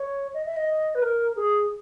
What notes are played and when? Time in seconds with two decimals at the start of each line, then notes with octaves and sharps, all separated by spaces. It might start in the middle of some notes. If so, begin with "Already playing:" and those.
Already playing: C#5
0.34 D#5
0.46 E5
0.56 D#5
0.95 B4
1.02 A#4
1.36 G#4